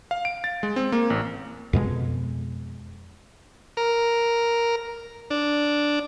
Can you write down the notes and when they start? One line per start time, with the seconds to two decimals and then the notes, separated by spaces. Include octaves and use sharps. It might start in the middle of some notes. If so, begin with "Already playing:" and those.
0.11 F5
0.25 D7
0.44 A6
0.63 G#3
0.76 C4
0.92 A#3
1.10 A1
1.73 F2 B2 G#3
3.77 A#4
5.30 D4